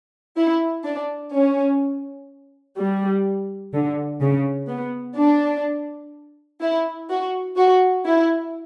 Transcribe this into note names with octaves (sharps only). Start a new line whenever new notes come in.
E4
D4
C#4
G3
D3
C#3
B3
D4
E4
F#4
F#4
E4